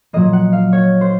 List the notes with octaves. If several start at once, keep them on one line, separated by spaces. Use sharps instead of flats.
A#2 F#3 A#3 D#5
F#5
F5
C#5
C5